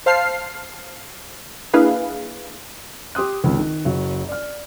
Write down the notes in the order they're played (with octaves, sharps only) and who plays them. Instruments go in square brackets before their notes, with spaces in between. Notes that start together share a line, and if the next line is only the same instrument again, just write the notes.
[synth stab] C5 F5 A5 F6 C7
A#3 D4 E4 G#4 B4 F5
[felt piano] G4 C6 D#6 F#6
G#1 C#2
D#3
F#1 F#3
D5 F6